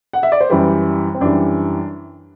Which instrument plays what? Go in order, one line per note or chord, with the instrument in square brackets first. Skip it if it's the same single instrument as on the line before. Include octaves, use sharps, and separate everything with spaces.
[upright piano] F#5
E5
D5
C5
F#2 E3 G3 B4
C4
F#2 E3 G3 D4